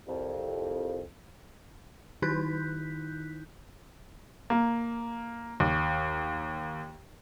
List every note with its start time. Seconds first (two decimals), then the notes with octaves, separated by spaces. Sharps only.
0.07 C2 F2
2.22 D#3 D#4 E4 F#6 G6 B6
4.50 A#3
5.60 D#2